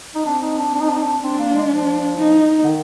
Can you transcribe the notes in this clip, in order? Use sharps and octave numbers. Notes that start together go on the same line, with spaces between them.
D#4
C4 D4
D#4
D4
C4 D4
D#4
D4
D#4
D4
C4 D4
A#3
G#3
F3
D#4
D3
D#3